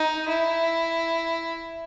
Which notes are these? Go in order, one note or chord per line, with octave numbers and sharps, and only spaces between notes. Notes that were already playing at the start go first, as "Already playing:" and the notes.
Already playing: D#4
E4